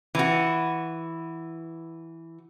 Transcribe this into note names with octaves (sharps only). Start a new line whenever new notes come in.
E3 F#4